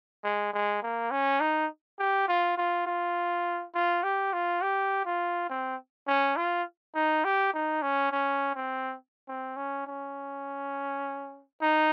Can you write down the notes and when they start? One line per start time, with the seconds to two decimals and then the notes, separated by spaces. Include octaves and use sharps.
0.23 G#3
0.53 G#3
0.83 A#3
1.11 C#4
1.40 D#4
1.99 G4
2.28 F4
2.58 F4
2.86 F4
3.75 F4
4.04 G4
4.33 F4
4.62 G4
5.05 F4
5.49 C4
6.07 C#4
6.37 F4
6.95 D#4
7.24 G4
7.54 D#4
7.82 C#4
8.12 C#4
8.55 C4
9.28 C4
9.57 C#4
9.87 C#4
11.61 D#4